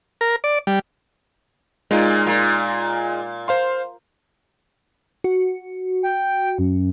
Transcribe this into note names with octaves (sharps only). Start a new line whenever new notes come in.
A#4
D5
G3
A#2 G#3 D#4 F4
A#2
C5 F5 C6
F#4
G5
F#2